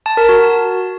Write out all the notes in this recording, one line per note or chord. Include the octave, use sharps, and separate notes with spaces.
A5
A#4
F#4